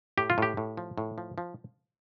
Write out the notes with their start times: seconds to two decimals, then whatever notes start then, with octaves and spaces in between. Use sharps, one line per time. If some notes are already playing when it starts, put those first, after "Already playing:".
0.17 A2 G4
0.30 F4
0.38 A2 G4
0.57 A2
0.77 F3
0.98 A2
1.18 F3
1.38 F3